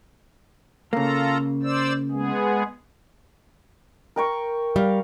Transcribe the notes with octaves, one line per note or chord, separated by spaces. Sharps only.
C#3 A#3 F4 A4 A#5
C5 D5 E6
G#3 B3 G#4
A#4 G5 C#6
G3 F5